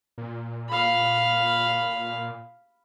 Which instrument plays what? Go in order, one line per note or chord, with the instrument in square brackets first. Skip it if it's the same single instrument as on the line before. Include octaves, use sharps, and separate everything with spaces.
[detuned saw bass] A#2
[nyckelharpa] F5 B5